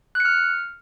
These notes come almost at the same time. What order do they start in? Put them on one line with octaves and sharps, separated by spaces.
F#6 C#7 F6